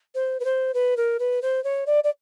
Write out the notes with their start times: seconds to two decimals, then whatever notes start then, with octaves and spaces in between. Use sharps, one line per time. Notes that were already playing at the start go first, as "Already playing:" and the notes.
0.14 C5
0.40 B4
0.44 C5
0.74 B4
0.97 A#4
1.19 B4
1.42 C5
1.64 C#5
1.86 D5
2.04 D5